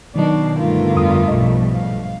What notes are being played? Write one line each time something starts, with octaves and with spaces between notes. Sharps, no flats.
B2 D#3 F#3 D4 D#4
G2 D3 G3 A3 B3 F4 A#4
F2 D#6
B1 G#2 F3 D#5
F5